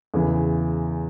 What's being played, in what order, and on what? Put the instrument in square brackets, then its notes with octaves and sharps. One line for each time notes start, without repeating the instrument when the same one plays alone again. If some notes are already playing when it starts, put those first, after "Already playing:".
[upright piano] E2 C#3 E3